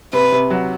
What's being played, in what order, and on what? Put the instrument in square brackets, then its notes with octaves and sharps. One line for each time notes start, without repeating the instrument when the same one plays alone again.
[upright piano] C3 [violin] B4
[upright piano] C3
F#3